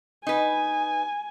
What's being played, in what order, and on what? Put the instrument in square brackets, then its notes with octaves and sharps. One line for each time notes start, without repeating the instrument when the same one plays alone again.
[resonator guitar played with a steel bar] D#4 B4 [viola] G#5